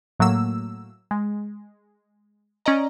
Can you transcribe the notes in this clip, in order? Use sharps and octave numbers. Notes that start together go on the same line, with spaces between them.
A2 F#3 A3 A#3 E6
G#3
C#4 D5 D#5 A#5